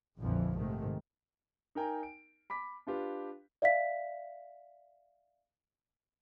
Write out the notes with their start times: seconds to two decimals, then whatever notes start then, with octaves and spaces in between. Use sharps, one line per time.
0.19 A#1 F2 D3 E3 F3
0.56 G#2 C3 D#3 A3
1.75 D#4 A#4 G5 G#5 A#5
2.03 D7
2.50 B5 D6 B6
2.87 D4 F4 G4 B4
3.62 D5 E5 F5 B6